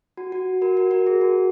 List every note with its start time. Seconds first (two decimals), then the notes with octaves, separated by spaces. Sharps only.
0.17 F#4
0.32 F#4
0.62 F#4 A#4
0.77 F#4 A#4
0.91 F#4 A#4
1.07 G#4
1.21 F#4